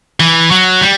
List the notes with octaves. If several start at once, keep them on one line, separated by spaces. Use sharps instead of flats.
E3
F#3
G3